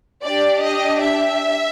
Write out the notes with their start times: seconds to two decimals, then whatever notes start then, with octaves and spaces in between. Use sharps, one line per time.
0.25 D4 G4 D5
0.64 D#5
1.03 E5